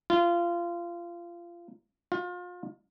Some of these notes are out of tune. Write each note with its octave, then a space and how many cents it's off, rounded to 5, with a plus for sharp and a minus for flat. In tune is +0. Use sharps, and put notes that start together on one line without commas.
F4 -20
F4 +35